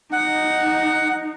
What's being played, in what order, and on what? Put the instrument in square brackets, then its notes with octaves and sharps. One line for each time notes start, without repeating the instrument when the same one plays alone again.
[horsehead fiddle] D#4 [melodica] F#5